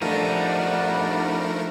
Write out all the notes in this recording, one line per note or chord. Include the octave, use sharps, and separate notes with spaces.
F3 G3 A3 D4 D#4 A#4 F#5